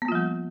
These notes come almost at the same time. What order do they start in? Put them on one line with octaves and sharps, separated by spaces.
B3 A#3 F4 F3 G3